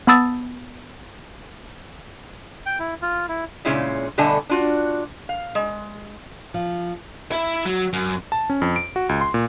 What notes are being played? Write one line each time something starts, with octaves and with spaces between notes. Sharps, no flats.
B3 A5 B5 D#6 E6 A6
G5
E4
F4
E4
A#2 C#3 G#3 C#4 E4 F4
B2 D3 G3 A3 G#5 A5
D4 F4 F#4
F5
G#3
F3
E4 E5
F#3
F#2
A5
C#4
F2
D7
F#4
C#2
C6
A#2